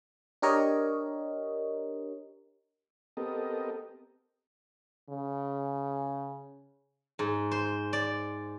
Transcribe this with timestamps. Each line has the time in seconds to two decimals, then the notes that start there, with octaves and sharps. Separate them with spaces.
0.42 D4 G4 A#4 C#5 D#5
3.17 B3 C4 G4 A4 A#4 D#5
5.10 C#3
7.19 G#2
7.51 C5
7.93 D5